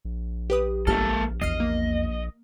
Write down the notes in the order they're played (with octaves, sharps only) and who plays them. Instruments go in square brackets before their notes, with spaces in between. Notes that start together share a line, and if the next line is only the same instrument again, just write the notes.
[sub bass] A#1
[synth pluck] G4 B4 D#6
[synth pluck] G1 G4 F6 [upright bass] G#3 [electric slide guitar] A#3 A4
[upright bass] E2 [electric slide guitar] D#5 [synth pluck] F6 C7
[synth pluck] A#3